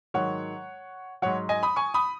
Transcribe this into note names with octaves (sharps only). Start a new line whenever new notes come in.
G#2 D#3 F#3 C#5 F#5
G#2 F#3 C#5 F#5
D#5 G#5
B5 D#6
G#5 C#6
B5 D#6